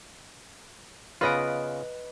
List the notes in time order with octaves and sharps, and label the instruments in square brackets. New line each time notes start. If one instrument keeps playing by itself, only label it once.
[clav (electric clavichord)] C#3 B3 F4 [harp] B4 D#5 D7